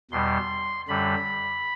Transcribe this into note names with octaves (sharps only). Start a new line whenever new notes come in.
E2 B2 G3 C6
F#2 D3 G3 B5